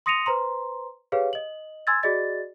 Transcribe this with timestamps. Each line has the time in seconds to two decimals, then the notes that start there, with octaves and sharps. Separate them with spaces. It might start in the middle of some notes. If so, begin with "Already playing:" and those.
0.06 C6 D#6 A#6 C#7 D#7 F7
0.26 B4 C5 A#5 C6
1.12 G4 G#4 B4 C#5 F5
1.33 D#5 F#7
1.87 G#5 C6 E6 G#6 A6
2.03 F#4 G#4 D5 D#5 A6